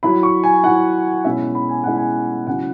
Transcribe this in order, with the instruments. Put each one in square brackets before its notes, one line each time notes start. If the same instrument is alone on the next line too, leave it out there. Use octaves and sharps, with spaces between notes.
[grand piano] F#3 E4 B5
C#6
G#5
F#3 E4 F#5
B2 G#3 C#4 E4 E5
B5
G#5
B2 G#3 C#4 E4 F#5
G#5
C#3 F#3 C#4 E4 F#5